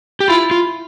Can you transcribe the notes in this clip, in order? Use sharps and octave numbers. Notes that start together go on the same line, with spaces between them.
G4
E4 F4
F4